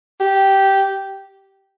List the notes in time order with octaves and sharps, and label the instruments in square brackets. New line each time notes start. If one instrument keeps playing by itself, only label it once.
[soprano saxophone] G4